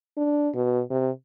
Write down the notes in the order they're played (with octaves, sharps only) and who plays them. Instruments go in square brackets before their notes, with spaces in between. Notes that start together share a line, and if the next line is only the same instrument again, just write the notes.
[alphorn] D4
B2
C3